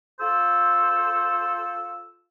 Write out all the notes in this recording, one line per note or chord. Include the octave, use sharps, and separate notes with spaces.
F4 A4 C5 E6